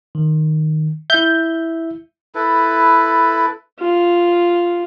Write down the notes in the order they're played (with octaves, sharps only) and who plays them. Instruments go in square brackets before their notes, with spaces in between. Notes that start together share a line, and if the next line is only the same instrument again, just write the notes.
[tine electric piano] D#3
[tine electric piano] E4 E5 [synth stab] G6
[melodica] E4 A4 B4
[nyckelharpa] F4